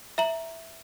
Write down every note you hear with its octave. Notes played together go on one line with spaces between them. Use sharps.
E5 A#5 F#7